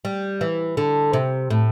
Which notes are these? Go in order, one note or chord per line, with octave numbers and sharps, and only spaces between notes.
G3
E3
D3
C3
A2